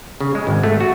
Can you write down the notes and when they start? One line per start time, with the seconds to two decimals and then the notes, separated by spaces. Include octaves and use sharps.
0.20 C#3
0.35 G#3
0.47 G#1
0.64 A3
0.81 F#4